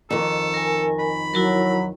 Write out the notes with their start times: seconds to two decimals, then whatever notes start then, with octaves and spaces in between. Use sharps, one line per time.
0.10 F2 D#3 A4
0.54 A#4 G#5
0.99 B5
1.34 F#3 E4 F#4 A#4